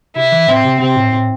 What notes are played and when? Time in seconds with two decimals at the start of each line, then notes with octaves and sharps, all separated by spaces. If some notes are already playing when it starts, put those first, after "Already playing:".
0.15 C3 E4
0.32 E3
0.47 A2 C4
0.64 C3
0.80 C3 C4
0.96 A2
1.12 A2